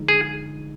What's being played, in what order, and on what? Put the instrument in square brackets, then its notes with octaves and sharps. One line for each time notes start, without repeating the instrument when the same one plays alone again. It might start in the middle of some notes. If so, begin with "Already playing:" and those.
Already playing: [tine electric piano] D3 F3 G#3 D#4
[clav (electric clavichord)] G#4